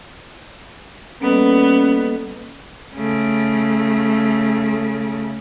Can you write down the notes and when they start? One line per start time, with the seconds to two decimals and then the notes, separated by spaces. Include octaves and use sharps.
1.22 G3 A#3 B3 C#4 A4 D#5
2.95 C#3 A3